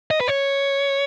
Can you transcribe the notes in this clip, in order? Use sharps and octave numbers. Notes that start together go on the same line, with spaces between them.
D#5
B4
C#5